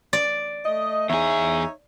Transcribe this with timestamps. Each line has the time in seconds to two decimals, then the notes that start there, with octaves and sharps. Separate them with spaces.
0.13 D5
0.66 A3 D#5
1.10 E2 D#4 G#4 C#5 E5